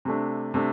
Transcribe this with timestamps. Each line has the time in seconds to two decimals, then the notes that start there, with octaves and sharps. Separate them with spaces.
0.05 C3 A3 D4
0.54 C3 A3 D4